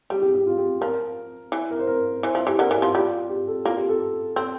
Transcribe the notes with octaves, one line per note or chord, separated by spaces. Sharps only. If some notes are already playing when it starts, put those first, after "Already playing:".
G3 G4
G4
G4
F4
G4
F3 A#4
E3
A#4
C5
A#4
E3 C5
F3 E5
E3 G4
D3 A#4
E3
G4
F3
G3 F4
G4
A4
A#3 F4
G4
A4
C4 A4